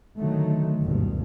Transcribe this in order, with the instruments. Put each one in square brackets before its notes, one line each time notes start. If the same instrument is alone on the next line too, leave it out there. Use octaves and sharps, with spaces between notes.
[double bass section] D3 D#3 F#3 A3
F#1 D2 G2 B2